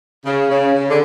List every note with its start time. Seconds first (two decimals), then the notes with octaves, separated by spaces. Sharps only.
0.25 C#3
0.49 C#3
0.74 C#3
0.89 D3